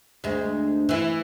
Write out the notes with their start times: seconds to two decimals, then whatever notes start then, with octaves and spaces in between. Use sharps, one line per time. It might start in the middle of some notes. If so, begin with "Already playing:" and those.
0.24 D2 G#3
0.89 E3 E4